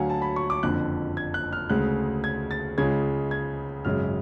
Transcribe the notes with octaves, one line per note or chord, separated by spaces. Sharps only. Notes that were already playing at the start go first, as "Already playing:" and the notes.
Already playing: D2 D3 F#3 F5 F#5 G#5
A5
B5
C#6
D6
F#1 F2 D3 F#6
G#6
F#6
F6
D2 C#3 G#3 F#6
G#6
A6
C#2 C#3 G#3 G#6
G#6
G#1 F#2 C#3 G#3 F6